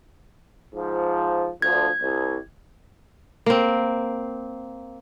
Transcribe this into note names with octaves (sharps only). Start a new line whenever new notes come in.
G#2 F3
D2 D3 F3 G#6
C2
A#3 C4